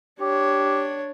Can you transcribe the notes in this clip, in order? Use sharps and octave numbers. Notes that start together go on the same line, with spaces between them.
D4 G4 C#5